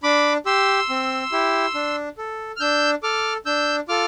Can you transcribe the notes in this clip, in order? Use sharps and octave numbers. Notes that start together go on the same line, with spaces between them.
D4 B5 D6
G4 C6 E6
C4
E4 G4
D4
A4
F6
D4 E6 G6
A4 D6 F6
D4 E6 G6
F4 A4 D6 F6